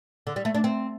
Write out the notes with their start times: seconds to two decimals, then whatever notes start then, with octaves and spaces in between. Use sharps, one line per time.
0.27 D3
0.36 G3
0.45 A3
0.55 D4
0.64 C4